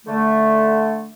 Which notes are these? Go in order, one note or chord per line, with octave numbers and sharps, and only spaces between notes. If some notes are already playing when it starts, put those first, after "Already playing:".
D3 A3